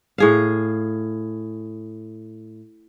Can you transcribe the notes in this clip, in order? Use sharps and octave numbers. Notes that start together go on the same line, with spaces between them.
A2 G#4 F5